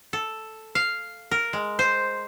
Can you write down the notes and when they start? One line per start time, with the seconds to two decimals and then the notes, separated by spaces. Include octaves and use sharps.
0.13 A4
0.75 F5
1.31 A#4
1.53 G#3
1.79 C5